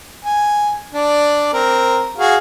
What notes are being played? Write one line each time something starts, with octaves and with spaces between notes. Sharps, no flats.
G#5
D4 D5
C4 A#4
F#4 G#4 F5